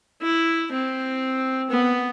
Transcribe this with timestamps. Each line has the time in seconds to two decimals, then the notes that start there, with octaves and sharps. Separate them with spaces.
0.22 E4
0.72 C4
1.70 B3